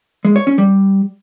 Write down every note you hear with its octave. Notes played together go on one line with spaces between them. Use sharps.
G#3
C#5
C#4
G3